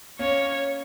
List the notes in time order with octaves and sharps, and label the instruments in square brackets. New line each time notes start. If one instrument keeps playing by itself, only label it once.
[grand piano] A#3 C#4 [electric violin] C#5